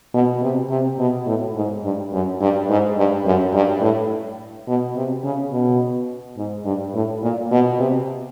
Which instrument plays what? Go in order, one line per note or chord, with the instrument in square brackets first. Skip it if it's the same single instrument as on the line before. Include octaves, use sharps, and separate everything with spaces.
[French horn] B2
C3
C3
B2
A2
G#2
G2
F#2
G2
G#2
G2
F#2
G2
A2
B2
C3
C#3
B2
G#2
G2
A2
A#2
B2
C3